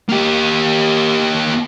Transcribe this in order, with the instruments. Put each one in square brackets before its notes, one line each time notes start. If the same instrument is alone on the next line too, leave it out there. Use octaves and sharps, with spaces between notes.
[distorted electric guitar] A#3 G4